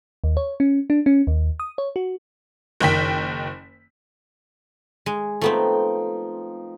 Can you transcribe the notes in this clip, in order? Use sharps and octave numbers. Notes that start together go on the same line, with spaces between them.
D#2
C#5
C#4
D4
C#4
D#2
D#6
C#5
F#4
F#1 D#3 G5 B6
G#3
F3 A3 B3 C4 D#4 G5